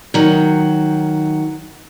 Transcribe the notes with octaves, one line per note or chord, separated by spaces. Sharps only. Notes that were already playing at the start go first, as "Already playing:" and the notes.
D#3 F#3